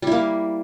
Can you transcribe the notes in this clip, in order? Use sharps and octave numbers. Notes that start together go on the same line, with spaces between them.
G3 A#3 E4